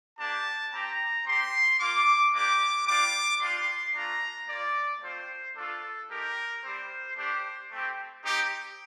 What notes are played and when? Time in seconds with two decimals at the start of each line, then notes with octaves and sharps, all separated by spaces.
0.19 A#3 D4 G4 A5
0.72 C4 G4 A#5
1.26 C4 G4 C6
1.79 A#3 F4 D6
2.34 A#3 D4 G4 D6
2.87 G3 D4 F4 D6
3.41 G3 D4 F4 C6
3.94 A3 D4 F4 A#5
4.48 A#3 F4 D5
5.02 A3 C4 F4 C5
5.56 A3 D4 F4 A4
6.09 A3 D#4 G4 A#4
6.63 G3 C4 G4 C5
7.17 A3 D4 G4 C5
7.71 A3 C4 G4
8.25 C4 D#4 G4